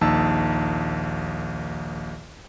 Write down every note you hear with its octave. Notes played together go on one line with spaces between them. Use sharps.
A#1 D#2 D#4 A5 E6